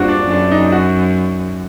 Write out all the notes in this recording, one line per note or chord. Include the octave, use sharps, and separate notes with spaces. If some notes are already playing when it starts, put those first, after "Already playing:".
Already playing: G2 A#3 C4 F4 F#4
D4
F#2 D4
D#4
F#4